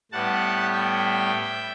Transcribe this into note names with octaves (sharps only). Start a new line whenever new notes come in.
A2 G3 B3 F#5 A5
E5 G5